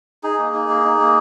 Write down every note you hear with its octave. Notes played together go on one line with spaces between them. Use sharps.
D#4 G#4
A#3
D#4
A#3
D#4
A#3